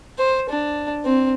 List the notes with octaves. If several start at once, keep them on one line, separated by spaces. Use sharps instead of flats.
C5
D4
C4